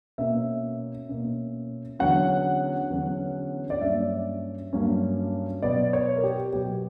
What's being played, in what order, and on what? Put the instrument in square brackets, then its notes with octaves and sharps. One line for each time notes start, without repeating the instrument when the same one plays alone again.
[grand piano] B2 A#3 C#4 E5
B2 A#3 C#4
E2 D3 F#3 C#4 F#5
E2 D3 F#3 C#4
D5
G2 F#3 A#3 C#4 E5
G2 F#3 A#3 C#4
B2 F#3 B3 D5
C#5
A#4
G4
B2 F#3 B3 G4